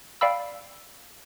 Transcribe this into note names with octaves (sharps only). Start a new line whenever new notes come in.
D5 F5 G5 B5 E6